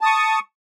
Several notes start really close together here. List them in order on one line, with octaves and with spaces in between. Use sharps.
A5 D#6 C#6